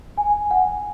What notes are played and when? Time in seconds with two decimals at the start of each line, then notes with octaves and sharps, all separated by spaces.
0.17 G#5
0.51 F#5